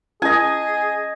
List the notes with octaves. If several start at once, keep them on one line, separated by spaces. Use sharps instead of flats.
C#4 G#4 D#5 G#5